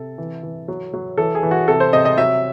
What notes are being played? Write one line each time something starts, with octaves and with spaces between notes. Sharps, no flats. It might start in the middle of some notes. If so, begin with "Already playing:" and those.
Already playing: C3 A4
E3
E3
F#3
F#3
E3 A4
G#4
E3
F#4
C3 A4
C5
C3 D#5
D#5
F#3 E5